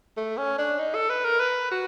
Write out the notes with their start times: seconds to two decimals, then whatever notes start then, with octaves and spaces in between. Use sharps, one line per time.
0.17 A3
0.37 C#4
0.58 D4
0.79 D#4
0.95 A4
1.10 B4
1.25 A#4
1.40 B4
1.71 F#4